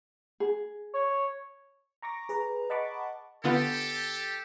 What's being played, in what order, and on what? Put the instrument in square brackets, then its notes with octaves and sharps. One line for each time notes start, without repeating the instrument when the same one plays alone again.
[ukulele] G#4
[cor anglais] C#5
[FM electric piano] A#5 C#6 D6 A#6
G#4 B4 A#5
D#5 F#5 A5 B5 C#6 D6
[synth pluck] D3 B3 F4 [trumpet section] G4 A4